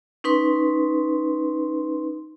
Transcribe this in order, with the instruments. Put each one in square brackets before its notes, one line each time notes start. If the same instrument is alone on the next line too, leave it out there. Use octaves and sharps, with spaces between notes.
[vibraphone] C#4 D#4 B4 C6